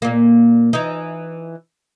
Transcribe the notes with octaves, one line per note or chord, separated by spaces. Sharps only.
A#2 A#3
E3 D#4